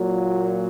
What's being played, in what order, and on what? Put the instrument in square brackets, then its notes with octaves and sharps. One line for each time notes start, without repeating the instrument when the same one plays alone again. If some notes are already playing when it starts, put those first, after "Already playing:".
Already playing: [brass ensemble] A#2 F#3